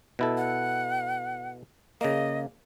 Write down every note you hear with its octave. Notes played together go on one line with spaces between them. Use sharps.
B2 E4 A4
F#5
C#3 A#3 D#5